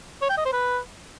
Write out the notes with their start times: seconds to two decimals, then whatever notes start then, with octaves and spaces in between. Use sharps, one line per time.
0.22 C#5
0.30 G5
0.37 D#5
0.45 C5
0.53 B4